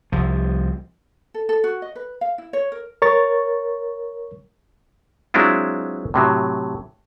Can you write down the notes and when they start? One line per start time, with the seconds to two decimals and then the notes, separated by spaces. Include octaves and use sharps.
0.12 C2 F3
1.34 A4
1.49 A4
1.64 F#4
1.82 D#5
1.96 B4
2.21 F5
2.38 E4
2.53 C#5
2.72 A#4
3.02 A#4 C#5 C#6 A6
5.34 F#3 G#3 C4 D4 E4 F4
6.14 A2 C3 F#3